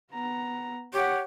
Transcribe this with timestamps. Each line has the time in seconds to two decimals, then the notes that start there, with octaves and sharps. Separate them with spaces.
0.12 B3 A#5
0.93 G4 C#5 F#5